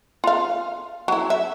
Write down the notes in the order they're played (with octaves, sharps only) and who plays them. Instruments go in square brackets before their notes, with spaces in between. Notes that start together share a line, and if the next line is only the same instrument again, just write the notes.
[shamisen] F4 F5
F#3 E4
E5